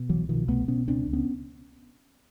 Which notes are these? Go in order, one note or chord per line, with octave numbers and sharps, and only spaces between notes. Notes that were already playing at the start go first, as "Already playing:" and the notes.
Already playing: B2
C2 E3 F#3
B2 D#3 F3
C2 A3 B3
B2 B3 C#4
C#2 C4 D4
C#2
B3 C#4